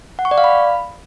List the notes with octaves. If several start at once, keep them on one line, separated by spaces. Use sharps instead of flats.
F#5
C#6
D5
F5
B5